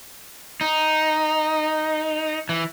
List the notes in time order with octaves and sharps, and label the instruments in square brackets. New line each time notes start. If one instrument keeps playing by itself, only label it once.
[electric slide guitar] D#4
E3